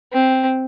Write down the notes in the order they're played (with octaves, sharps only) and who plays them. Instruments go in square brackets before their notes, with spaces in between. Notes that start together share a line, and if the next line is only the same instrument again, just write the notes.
[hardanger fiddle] C4